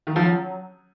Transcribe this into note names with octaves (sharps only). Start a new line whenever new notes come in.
D#3
F3
F#3